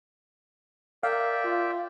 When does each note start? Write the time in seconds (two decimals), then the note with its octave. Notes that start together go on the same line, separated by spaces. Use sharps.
1.03 A#4 D5 E5 F5 G5
1.44 F4